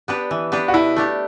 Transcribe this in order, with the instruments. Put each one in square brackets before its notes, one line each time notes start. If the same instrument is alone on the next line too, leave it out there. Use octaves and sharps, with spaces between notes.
[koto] B3 D4 G4 B4
E3
B3 D4 G4 B4
[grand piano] F#4
[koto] B2 [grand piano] E4
[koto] A3 D4 G4